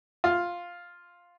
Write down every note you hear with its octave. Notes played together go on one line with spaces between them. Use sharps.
F4